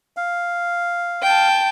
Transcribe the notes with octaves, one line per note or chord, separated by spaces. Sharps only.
F5
G5 A5